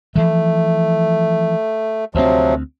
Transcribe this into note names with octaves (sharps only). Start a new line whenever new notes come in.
E3 F3 A3
D2 C3 F3 F#3 C4